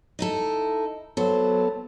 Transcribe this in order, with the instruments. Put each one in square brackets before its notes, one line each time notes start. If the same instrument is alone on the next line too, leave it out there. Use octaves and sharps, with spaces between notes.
[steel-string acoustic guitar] D#4 E4 A4
[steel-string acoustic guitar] F#3 C5 [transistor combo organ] B3 A4